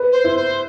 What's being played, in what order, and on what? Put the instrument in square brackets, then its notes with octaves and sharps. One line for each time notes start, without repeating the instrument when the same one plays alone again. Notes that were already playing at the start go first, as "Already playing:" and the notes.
Already playing: [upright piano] B4
[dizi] C5
[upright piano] E4
[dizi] C5